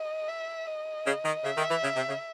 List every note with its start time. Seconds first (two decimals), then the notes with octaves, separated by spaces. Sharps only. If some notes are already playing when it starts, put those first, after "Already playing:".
Already playing: D#5
0.28 E5
0.67 D#5
1.06 C#3
1.24 D#3
1.44 C#3 E5
1.57 D#3
1.70 E3
1.83 C#3
1.96 C3
2.08 C#3